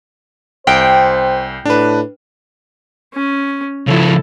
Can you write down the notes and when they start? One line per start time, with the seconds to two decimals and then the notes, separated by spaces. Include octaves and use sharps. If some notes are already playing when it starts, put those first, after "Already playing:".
0.67 C2 C5 G5
1.65 A2 D4 B4
3.14 C#4
3.88 C#3 F3 E4 A4